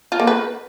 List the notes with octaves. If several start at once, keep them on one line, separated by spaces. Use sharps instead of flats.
F4
A#3
B4